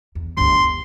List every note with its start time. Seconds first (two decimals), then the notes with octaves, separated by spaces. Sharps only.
0.15 E2
0.37 G1 D2 C6
0.55 B3